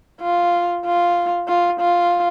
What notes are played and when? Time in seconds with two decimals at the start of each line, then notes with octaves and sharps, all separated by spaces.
0.21 F4
0.85 F4
1.48 F4
1.80 F4